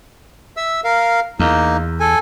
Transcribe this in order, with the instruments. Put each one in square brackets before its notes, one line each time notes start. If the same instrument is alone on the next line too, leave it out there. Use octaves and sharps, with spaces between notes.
[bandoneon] E5 E6
A#4 F5
[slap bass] E2 [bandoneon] A#3 D#4
[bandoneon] A4 G#5